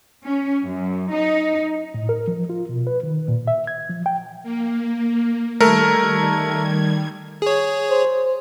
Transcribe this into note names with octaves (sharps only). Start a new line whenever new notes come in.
C#4
F#2
D#4
A2
A#4
F3
F4
B2
B4
D#3
A#2
E5
G#6
F3
G5
A#3
D#3 G3 A3 A#4 G#6
G#4 C#5
C5